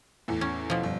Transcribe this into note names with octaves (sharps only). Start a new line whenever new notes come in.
E2 A2
C#4
B2 F3
G1